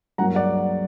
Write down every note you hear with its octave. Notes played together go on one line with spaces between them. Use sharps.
G2 F#3 A#3 F#5 A#5
D5 F#5